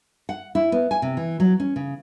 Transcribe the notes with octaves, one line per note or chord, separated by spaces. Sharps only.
F#5
E4
B3
G#5
C3
E3
F#3
C#4
C#3